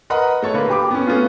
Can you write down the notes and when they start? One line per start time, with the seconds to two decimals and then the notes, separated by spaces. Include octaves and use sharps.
0.10 A#4 B4 D#5 F#5 A#5 B5
0.42 A3 A4 C#5
0.54 D3 A#3 B4
0.70 G4 B5 D6
0.91 B3 C#4
1.07 A3 B3 C#4 F4